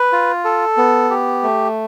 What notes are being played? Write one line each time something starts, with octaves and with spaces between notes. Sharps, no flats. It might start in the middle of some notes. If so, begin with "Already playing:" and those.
Already playing: B4
F4
A4
B3
G4
A3